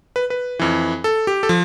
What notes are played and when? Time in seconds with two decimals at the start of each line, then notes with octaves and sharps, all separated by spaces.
0.16 B4
0.30 B4
0.59 F2 E3
1.04 A4
1.27 G4
1.43 A4
1.49 F3